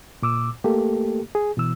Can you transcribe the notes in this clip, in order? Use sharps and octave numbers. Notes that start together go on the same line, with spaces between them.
A#2 D6 E6
A3 A#3 G4 A4
G#4
B2 E3 E6